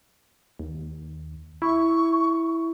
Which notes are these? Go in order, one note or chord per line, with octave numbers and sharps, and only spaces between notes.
D#2
E4 C#6